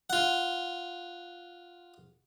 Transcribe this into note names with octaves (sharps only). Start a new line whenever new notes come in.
F4 F#5